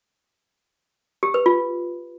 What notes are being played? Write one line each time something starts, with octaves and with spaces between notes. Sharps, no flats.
G4
B4
F4